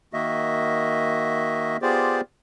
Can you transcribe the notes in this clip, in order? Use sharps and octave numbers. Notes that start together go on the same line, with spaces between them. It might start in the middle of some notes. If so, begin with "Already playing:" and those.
D#3 A#3 F#4 D#5 E5
B3 F4 G4 G#4 C5 D5